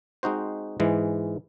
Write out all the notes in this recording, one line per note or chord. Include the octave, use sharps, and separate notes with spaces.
G#3 C4 D#4 F#4 C5
G#2 E3 G#3